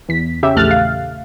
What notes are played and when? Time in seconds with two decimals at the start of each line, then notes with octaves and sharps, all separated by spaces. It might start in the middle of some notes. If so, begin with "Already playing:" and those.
0.09 E2 B6
0.43 C#3 G4 E5
0.56 A#1 E2 A3 F6 F#6 A6
0.71 F5